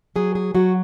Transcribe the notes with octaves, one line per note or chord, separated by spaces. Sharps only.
F#3 G#4
G#4
F#3 F#4